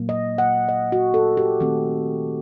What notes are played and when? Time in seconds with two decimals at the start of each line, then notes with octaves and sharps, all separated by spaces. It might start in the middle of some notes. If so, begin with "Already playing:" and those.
Already playing: A#2 F#3 A#3
0.09 D#5
0.38 F#5
0.69 D#5
0.92 F#4
1.14 A4
1.37 G4
1.60 D#3 A3 C4